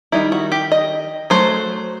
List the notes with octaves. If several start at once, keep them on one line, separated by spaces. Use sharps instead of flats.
D#3 G3 D#4 E4
F#4
G4
D#5
F#3 A3 C5